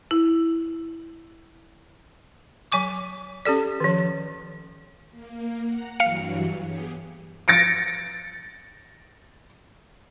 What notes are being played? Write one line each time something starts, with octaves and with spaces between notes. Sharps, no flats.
E4
F#3 G#5 C#6 D6
C#4 G4 A4 D5
D#3 F3
A#3
F#5 A#5
G2 E3 F#3 F5 C#7
B3 G4 G#4
A6 A#6 C#7 D7